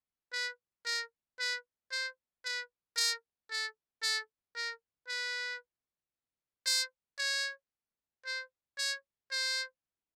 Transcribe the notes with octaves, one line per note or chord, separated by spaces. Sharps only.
B4
A#4
B4
C5
B4
A#4
A4
A4
A#4
B4
C5
C#5
C5
C#5
C5